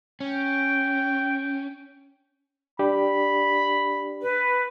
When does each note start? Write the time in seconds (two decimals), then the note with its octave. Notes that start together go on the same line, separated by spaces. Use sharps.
0.20 C#4 G5
2.79 D4 G4 D5 B5
4.21 B4